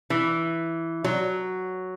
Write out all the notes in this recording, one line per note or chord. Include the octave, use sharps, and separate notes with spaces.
E3
F#3